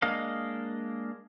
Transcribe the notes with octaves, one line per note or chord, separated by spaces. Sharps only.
G#3 A#3 D4 D#5 F5